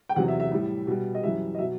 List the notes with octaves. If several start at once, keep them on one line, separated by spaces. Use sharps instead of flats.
G5
E2 C3 F#3 F#5
E5
E5
A2 G3
B2 G3
D#5
F#2 E3 G3 E5
D#5
B2 F#3 E5